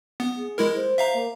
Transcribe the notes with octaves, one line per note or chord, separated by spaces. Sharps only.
B3
G#4
G#3 E4 A#4
C5
E5 F5 A#5
A#3